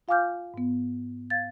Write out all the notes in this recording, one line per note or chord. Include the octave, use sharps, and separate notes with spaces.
F4 F5 G#5 D6 F6 G6
G#2 B3
F5 G#6 A6